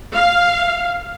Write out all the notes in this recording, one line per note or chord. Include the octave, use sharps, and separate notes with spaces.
F5